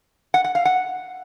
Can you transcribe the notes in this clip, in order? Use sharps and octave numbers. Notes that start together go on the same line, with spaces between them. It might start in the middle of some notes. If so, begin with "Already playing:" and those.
F#5
F#5
F5
F#5